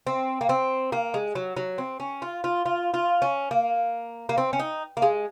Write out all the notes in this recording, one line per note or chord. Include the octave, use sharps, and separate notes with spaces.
C4
A#3
C4
A#3
G#3
F#3
F#3
C4
C#4
F4
F4
F4
F4
C#4
A#3
A#3
C4
C#4
D#4
A#3
G#3